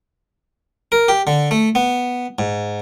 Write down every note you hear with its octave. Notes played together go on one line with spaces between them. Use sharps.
A#4
G4
D3
A3
B3
G#2